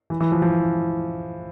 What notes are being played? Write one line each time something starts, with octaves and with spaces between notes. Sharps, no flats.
E3
E3
F3
F3